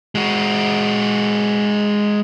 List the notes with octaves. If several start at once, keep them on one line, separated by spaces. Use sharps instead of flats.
G#3 F#4